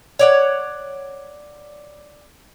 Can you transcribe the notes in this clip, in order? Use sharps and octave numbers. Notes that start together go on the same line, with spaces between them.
C#5 D5 F#5